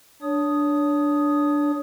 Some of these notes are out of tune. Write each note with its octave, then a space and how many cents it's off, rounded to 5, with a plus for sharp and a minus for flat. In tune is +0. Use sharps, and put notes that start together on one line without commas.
D4 +0 C#5 +30 D#6 +0